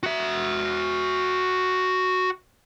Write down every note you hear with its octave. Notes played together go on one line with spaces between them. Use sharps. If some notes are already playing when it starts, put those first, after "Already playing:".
F#4 E5